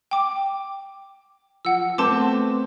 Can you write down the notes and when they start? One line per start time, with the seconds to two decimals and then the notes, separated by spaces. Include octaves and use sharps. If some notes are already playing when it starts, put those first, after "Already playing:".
0.11 G5 D6
1.65 F3 F#5 E6
1.98 A3 B3 C4 A5 C6 D6